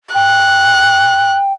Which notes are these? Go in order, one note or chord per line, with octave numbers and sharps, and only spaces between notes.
G5 F#6